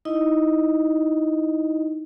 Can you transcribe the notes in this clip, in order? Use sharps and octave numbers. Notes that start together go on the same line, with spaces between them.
D#4 E4 D#5